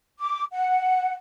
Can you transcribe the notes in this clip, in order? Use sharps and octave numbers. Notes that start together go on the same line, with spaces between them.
D6
F#5